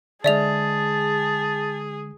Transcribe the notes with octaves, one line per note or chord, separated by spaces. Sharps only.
D3 G#3 G#4 D5 E5 A5 F7